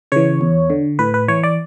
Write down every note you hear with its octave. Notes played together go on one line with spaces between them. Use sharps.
C#3 E3 C#5
E2
D3
A2 B4
B4
E3 C#5
D5